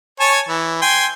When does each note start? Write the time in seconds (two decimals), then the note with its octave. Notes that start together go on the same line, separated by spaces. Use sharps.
0.20 C#5 G#5 A5
0.48 E3
0.82 G5 G#5 C6